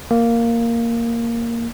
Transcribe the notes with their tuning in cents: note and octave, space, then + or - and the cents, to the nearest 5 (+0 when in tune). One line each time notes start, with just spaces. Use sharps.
A#3 -5